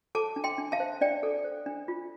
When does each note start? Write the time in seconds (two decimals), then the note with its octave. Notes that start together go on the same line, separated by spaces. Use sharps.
0.15 A4 A5 D6
0.36 D4
0.44 G5 C6
0.58 D4
0.72 F5 A5
0.80 C5
1.01 D4 D5 G5
1.23 A4
1.44 C5
1.66 D4
1.88 F4